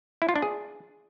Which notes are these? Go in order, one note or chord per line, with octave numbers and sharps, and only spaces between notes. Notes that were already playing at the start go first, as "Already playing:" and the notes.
E4
F4
D4
G#4